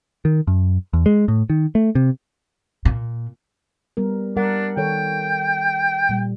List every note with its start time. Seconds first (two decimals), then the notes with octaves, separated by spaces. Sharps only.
0.25 D#3
0.47 F#2
0.93 E2
1.06 G#3
1.28 A2
1.50 D#3
1.75 A3
1.95 C3
2.85 A#2
3.97 G3 B3 A#4
4.37 G3 D4 A#4 F#5
4.77 D#3 A4 C#5 G5
6.09 A#2 G3